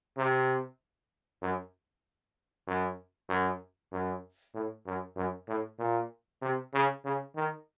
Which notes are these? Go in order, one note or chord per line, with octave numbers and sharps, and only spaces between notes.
C3
F#2
F#2
F#2
F#2
A2
F#2
F#2
A2
A#2
C3
C#3
C#3
D#3